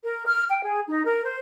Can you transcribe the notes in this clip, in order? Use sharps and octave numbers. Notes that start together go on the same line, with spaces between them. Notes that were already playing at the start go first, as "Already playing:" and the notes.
A#4
F6
G5
G#4
D#4
A#4
C5